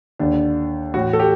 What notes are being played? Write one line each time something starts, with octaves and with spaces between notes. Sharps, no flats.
D#2 D3 D4
A1 A2 F#4
A4
G4